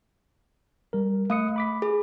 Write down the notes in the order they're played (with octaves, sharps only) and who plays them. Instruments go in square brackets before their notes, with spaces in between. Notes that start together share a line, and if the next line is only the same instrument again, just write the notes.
[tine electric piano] G3 A#4
[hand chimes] A3 [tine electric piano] F5 D#6 C#7
[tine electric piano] B5 D6 B6
[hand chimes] G#4